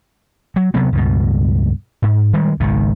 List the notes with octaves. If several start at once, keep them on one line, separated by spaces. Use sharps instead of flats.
F#3
C3 F#3 B3
C#2 G2 B2
G#2
D#3 G3 G#3
G#1 C#2 B2 D#3